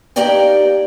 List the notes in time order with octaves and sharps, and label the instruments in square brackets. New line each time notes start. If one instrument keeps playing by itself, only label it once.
[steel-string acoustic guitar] A#3 D#4 G4 A#4 D5 G5